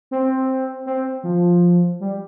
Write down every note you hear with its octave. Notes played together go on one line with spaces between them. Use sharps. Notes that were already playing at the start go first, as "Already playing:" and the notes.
C4
C4
F3
G3